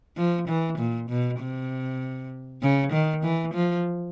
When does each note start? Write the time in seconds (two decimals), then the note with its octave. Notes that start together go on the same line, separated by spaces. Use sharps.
0.17 F3
0.48 E3
0.78 A#2
1.09 B2
1.40 C3
2.62 C#3
2.92 D#3
3.23 E3
3.54 F3